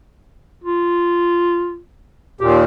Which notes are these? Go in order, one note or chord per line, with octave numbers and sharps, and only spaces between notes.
F4
D#2 A#2 G4